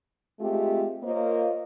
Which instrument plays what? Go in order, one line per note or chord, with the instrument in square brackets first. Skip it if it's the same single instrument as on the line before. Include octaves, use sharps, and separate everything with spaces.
[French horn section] G#3 A3 C4 F4 G4
A#3 F4 A#4 C5 C#5 D#5